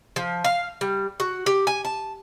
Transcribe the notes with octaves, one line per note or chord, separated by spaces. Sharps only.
F3
F5
G3
F#4
G4
G#5
A5